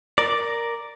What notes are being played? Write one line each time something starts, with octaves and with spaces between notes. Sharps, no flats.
A#4 D5